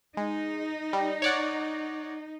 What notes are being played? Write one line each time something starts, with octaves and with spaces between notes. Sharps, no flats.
G#3 D#4
G3
C#5 D5 F#5